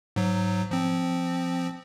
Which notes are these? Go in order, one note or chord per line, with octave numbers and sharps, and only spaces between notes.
G#2 F#3
F3 C4